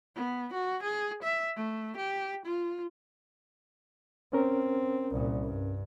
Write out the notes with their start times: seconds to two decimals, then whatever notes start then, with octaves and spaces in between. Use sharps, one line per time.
0.16 B3
0.53 F#4
0.83 G#4
1.23 E5
1.56 A3
1.97 G4
2.46 F4
4.33 C4 C#4 A#4
5.12 C2 A#2
5.44 G2